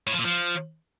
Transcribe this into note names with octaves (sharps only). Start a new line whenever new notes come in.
A2
F3
A#2
F3